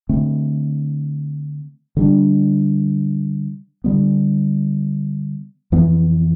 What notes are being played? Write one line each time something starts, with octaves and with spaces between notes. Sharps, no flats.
D3 A3 C4
D3 G3 D4
D3 G3 B3
F2 E3 B3